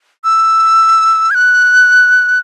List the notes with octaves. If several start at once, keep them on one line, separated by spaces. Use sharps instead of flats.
E6
G#6
F#6